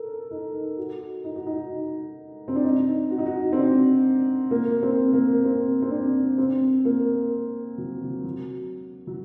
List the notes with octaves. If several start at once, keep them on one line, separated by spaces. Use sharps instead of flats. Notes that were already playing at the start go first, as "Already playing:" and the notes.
Already playing: A4 A#4
D#4
F#4
D#4
F#4
D#4
C4
D4
D#4
F#4
D#4
F#4
C4
D4
A#3
C4
A#3
C4
C4
D4
C4
A#3
F#3
F#3
F#3
F#3